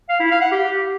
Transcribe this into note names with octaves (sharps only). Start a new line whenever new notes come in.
F5
E4
F5
F#5
G4